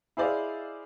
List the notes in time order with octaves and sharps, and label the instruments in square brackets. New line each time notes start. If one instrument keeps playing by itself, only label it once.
[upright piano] E4 G#4 C5 D5 D#5 F5